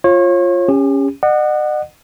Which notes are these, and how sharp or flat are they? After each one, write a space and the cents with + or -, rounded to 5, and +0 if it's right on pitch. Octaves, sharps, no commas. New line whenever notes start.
F4 +0 C#5 -35
C#4 +0 G4 +40
D#5 -45 F#5 +0